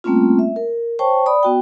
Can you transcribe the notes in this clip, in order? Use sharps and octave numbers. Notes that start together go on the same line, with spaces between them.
G3 A3 A#3 C4 C#4 F4
E5
A#4
C5 C#5 G5 A5 C#6
D5 B5 D#6
B3 F#4 G5